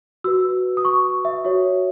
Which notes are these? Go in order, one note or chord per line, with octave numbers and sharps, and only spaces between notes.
F#4 B4 E6
D#6
C#6
E5
F#4 C#5 E5